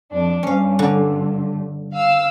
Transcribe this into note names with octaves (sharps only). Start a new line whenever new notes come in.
F2 D4
G2 C#4 F5
D3
F5 E6